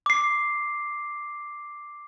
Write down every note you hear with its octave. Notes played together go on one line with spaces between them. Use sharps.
D6 C7